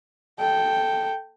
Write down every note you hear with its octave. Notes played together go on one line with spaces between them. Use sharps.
A4 G5